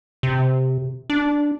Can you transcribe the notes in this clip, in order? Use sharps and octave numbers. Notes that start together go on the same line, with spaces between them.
C3
D4